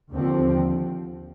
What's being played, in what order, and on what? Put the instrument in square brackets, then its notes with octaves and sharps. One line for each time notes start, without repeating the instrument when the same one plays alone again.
[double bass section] D#2 D3 F3 C4